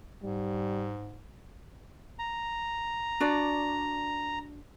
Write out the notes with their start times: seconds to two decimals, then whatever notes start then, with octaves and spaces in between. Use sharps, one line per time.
0.22 G#2 G3
2.19 A#5
3.20 D4 F#4 D5